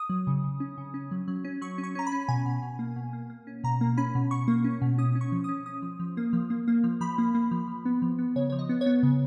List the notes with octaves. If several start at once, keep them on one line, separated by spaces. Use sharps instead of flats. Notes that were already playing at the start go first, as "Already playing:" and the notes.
Already playing: D#6
F#3
C#3
C#3
C#4
C#3
C#4
F#3
F#3
C#4
F#3 C#6
C#4
C#6
C#4 A#5
B5
C#4
B2 G#5
B2
B2
A#3
B2
A#3
A#3
C#4
B2 A#5
A#3
C#4 B5
B2
B2 C#6
A#3
C#4
B2
C#4 D#6
C#4
C#6
F3
C#4 D#6
C#4 D#6
F3
F3
A#3
F3
A#3
A#3
F3
F3 B5
A#3
A#3
F3
F3
B3
F3
B3
C#3 C#5
F3 C#5
D#5
B3
C#5
B3
C#3